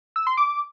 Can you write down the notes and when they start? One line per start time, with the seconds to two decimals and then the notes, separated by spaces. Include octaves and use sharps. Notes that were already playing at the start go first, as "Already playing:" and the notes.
0.16 E6
0.27 C6
0.37 D6